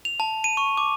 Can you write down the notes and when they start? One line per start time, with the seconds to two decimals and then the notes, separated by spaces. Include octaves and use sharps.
0.05 F7
0.20 A5
0.44 D#7
0.57 C#6
0.77 D6